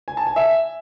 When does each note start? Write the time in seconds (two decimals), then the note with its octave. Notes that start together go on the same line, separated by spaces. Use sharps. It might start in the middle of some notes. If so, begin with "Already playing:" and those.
0.08 G#5
0.17 A5
0.27 G#5
0.36 E5